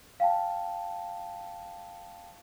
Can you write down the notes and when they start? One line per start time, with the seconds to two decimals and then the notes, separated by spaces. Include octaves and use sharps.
0.20 F5 G5 A5